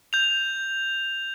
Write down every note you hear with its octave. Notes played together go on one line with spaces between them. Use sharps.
G6 F7